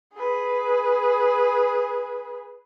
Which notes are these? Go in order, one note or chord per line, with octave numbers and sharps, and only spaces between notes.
G#4 B4